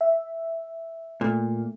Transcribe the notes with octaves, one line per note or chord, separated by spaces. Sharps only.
E5
A#2 A3